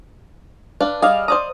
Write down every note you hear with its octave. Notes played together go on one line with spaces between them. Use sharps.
D4 B4 F5
G3 G#4 D5 D#5 F5 F6
C5 D5 A#5 D#6